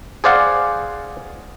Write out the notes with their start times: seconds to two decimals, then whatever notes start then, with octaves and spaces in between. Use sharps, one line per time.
0.24 G#4 C5 D5 F5 F#5